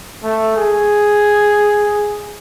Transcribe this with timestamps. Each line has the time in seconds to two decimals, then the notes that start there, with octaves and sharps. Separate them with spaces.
0.24 A3
0.57 G#4